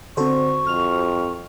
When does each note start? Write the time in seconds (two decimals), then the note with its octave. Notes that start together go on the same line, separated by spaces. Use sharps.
0.17 D3 C4 F#4 A4 C5 C#6
0.67 F2 F6 F7